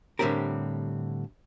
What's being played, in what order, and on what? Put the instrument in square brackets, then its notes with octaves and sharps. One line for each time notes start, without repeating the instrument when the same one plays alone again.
[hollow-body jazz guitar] A2 D3 G3 C4 G4 A#4